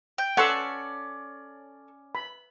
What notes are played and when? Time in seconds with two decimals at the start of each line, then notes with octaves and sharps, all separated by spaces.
0.18 G5
0.37 C#4 A4 D5 F#5 C6 C#6 E6
2.15 B5